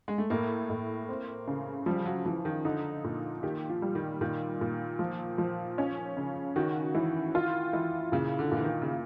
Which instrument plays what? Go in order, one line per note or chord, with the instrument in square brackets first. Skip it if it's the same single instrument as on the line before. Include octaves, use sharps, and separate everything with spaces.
[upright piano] G#3
A3
[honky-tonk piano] A2 [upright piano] A#3
[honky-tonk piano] A2
C4
C#3
[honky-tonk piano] F3 [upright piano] G3
[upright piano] F#3
[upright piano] E3 [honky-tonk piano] F3
[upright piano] D#3
[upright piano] D3 [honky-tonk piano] D#4
[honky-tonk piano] A#2
[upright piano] D#3 [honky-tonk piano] G4
[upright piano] F3
[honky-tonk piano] G3
[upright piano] D#3
[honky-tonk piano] A#2 [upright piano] D#3
[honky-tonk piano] A#2
F3
F3
C#4
C#3
[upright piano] D#3 [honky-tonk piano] F#4
[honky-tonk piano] E3
F4
E3
[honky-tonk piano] A#2 [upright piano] C#3
[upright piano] D3
[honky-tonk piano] A#2
[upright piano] E3
D#3
C#3